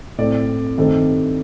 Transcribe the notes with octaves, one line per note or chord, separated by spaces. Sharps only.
A2 A3 C4 D5
G2 D#3 A3 C4